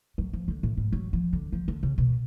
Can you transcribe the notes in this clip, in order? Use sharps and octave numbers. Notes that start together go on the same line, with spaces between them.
F#3
F3
D3
A2
G#2
F#3
F3
D3
F3
D3
C#3
B2